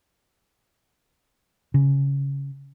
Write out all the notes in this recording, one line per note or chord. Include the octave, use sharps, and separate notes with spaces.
C#3